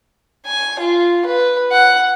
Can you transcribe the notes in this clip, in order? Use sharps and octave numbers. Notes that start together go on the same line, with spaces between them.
G#5
F4
B4
F#5